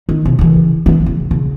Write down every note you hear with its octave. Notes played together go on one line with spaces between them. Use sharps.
D#3
C3
C#3 E3
E3 A3
C#3
C#3